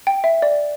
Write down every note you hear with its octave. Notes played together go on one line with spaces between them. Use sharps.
G5
E5
D5